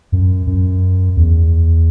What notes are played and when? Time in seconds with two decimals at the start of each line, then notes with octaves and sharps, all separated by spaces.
0.12 F#2
0.47 F#2
1.17 E2